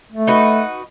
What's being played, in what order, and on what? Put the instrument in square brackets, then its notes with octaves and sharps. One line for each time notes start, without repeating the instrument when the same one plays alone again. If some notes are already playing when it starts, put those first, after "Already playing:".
[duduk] A3
[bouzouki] D#4 F#4 B4